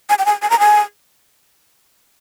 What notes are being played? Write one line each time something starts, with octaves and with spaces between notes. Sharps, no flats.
G#5
G5
G#5
G#5
A#5
G#5